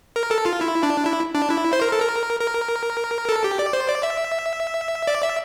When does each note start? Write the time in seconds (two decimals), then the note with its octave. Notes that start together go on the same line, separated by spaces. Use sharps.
0.16 A#4
0.31 A4
0.46 F4
0.61 E4
0.83 D4
1.06 E4
1.35 D4
1.50 E4
1.73 C5
1.81 A#4
1.92 A4
2.01 A#4
2.40 A#4
3.29 A4
3.44 G4
3.59 D5
3.73 C5
3.88 D5
4.03 E5
5.07 D5
5.22 E5